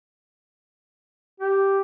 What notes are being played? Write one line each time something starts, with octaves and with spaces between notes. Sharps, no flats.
G4